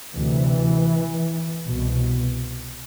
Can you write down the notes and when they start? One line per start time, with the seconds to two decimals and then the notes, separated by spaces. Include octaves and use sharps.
0.14 D2 C3 E3
1.66 C2 B2